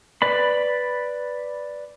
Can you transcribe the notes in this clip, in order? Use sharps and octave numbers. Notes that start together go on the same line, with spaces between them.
B4 D5 B5